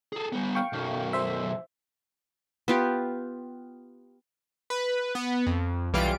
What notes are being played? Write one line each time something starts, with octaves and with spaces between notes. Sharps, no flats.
G#4 A4
G3 B3
F5 G5 C#6
B1 F#2
C5 E5
B3 F4 G4
B4
B3
F2
B1 E3 G3 F4 D7